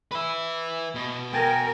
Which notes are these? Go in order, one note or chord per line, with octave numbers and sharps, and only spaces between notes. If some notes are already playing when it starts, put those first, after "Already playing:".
B4 E5
B2
A#4 G5 G#5 A6